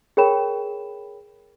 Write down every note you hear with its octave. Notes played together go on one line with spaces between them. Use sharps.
G#4 A#4 C#5 G5 B5 E7